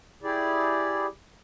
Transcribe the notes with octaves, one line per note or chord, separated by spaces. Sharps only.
E4 G4 G#4 D5